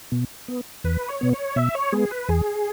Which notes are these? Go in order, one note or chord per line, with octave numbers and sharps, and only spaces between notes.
B2
B3
E2 B4
C#5
B2 B3
C#5
B2 E5
C#5
G#3 B3 G#4
B4
E2 G#4